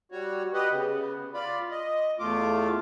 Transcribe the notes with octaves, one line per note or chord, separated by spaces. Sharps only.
G3 F#4 C#5
G4 B4 D#5 F#5
C#3 B3
F4 D5 B5
D#5
E2 A3 F4 D6